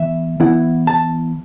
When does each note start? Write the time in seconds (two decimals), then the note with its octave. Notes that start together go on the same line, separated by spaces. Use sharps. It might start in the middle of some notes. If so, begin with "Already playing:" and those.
Already playing: E3 B3 E5
0.40 E3 B3 E4 F#5
0.87 A5